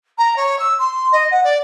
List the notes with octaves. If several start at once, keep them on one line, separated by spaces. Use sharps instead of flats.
A#5
C#5
E6
C6
D#5
F#5
D5